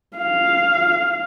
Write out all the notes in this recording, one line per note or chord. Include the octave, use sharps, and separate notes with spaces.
F5